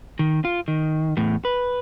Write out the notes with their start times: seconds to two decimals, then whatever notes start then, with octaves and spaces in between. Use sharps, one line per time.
0.19 D#3
0.45 F4
0.68 D#3
1.17 E2 A2
1.45 B4